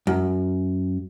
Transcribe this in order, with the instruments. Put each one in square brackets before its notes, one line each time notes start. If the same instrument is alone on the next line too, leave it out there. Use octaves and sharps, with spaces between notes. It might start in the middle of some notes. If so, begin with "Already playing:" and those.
[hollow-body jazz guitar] F#2